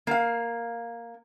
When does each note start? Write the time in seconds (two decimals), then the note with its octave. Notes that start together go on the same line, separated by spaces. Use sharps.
0.07 A#3 F5